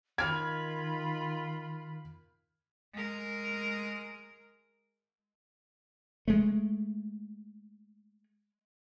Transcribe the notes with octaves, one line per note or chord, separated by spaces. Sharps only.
D#3 F4 B5 F6 G#6
G#3 A#4
G#3 A3